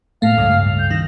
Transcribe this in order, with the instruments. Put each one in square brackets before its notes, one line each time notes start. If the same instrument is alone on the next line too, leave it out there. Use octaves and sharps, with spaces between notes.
[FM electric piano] A2 A3 [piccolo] F5
[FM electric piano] C#2 G2
[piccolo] G6
[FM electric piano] D#3 [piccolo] A#6